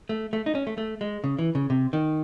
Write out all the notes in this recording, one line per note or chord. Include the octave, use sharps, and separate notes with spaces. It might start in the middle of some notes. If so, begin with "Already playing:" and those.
A3
A3
D#4
C#4
A3
A3
G#3
C#3
E3
C#3
C3
D#3